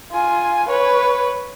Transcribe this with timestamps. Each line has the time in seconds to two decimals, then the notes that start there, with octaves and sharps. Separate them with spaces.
0.12 F4 G#5
0.68 B4 C#5